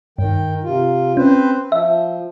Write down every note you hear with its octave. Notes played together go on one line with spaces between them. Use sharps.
G2 D#3 G5
C3 F4
C4 C#4 B4 C5
F3 E5